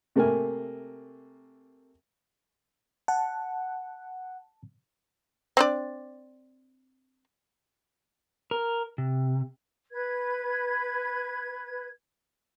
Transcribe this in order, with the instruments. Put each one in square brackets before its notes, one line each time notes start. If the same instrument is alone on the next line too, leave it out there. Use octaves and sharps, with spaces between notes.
[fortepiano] C3 A3 A#3 A#4 G#5
[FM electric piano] F#5 [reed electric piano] A5
[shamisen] C4 D4 D5
[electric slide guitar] A#4
C3
[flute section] B4 G#6